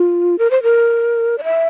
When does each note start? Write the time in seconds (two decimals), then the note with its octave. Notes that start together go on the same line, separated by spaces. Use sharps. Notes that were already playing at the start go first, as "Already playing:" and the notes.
Already playing: F4
0.38 A#4
0.51 C5
0.63 A#4
1.38 D5
1.44 E5